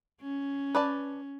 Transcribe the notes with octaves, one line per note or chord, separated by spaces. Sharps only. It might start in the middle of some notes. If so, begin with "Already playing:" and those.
C#4
B4 D5 A5